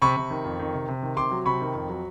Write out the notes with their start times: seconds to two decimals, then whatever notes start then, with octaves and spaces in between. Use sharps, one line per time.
0.02 C3 B5 C#6
0.17 C3
0.30 D#3
0.45 F2
0.60 D#3
0.74 C3
0.88 C3
1.03 D#3
1.17 C3 C6 D6
1.31 F#3
1.46 C3 B5 C#6
1.61 D#3
1.75 F2
1.89 F#3